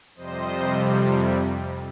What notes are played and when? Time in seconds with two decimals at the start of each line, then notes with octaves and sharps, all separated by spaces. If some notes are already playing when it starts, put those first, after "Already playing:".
0.16 F2 C3 G3 C5 D#5